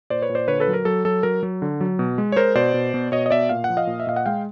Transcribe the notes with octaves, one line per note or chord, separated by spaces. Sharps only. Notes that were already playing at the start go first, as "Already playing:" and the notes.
A#2 C5 D5
B4 C#5
A#2
C5 D5
D3 B4 C#5
A4 B4
F#3
A#4
F#3 A4
F#3 A4
F#3 A#4
F#3
D3
F#3
B2
G#3
C#5
G#3 A#4 C5
B2 C5 D5
B2
B2
B2 C#5 D#5
D#5
B2 D5 E5
A#2 F5
F#5
F3
D#5 F5
A#2
E5
A#2 F5
F#5
G#3 F5 G5